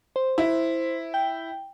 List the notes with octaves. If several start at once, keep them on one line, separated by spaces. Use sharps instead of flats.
C5
E4
G5